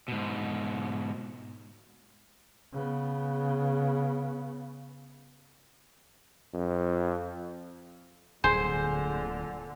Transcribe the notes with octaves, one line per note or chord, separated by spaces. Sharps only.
G#2 B2
C#3 B3
F2
D1 G2 A#2 D3 G#4 C5 G#5